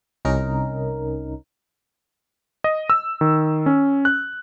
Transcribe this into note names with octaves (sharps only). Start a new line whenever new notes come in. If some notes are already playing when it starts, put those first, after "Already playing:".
C2 C#4 D#4 A#4
D#5
E6
D#3
C#4
F#6